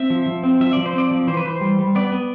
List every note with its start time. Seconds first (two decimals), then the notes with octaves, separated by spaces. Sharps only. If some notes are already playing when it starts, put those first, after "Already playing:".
Already playing: C4 E5
0.10 F3
0.26 F3
0.43 C4
0.61 F3 E5
0.73 F3 D5
0.86 C5
0.93 C4 D5
1.11 F3
1.27 E3 C5
1.37 B4
1.45 E3 C5
1.61 G3
1.79 G3
1.95 B3 D5
2.12 B3